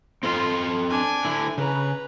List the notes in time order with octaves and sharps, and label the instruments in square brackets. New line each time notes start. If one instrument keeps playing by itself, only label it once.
[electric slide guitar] C4 A4 D#5 [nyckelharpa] F4
[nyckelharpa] D4 G#5
[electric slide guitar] D3 E4
[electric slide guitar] C#3 [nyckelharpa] B4 A#5